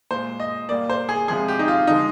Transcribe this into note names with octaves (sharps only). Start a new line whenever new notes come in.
A#2 G#3 C5
D#5
A#2 G3 A#3 D5
C5
G#4
C3 F3 G#3 G#4
G4
D#4
F4
D3 F3 G#3 D#4